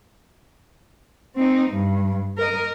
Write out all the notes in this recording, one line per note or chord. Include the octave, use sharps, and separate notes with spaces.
C4 D#4
G2
A#4 D#5